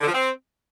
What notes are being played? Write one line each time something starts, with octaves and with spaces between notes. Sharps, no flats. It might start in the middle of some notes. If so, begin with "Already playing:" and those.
D3
F3
C4